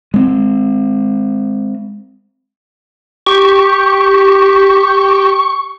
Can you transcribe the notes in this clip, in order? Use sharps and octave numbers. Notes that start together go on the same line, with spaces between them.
G#3 C4
G4 C#6